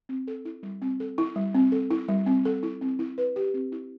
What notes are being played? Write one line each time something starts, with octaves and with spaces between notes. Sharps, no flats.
C4
A4
E4
G3
C4
A4
E4
G3
C4
A4
E4
G3
C4
A4
E4
C4
E4
B4
G4
C4
E4